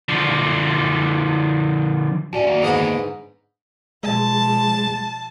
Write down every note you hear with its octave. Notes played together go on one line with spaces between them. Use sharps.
D3 F3
B1 C#4 F#4 D5 E5
D#3 A#3
G#2 D3 B3 D#5 B5
B2 F3 G#3 A5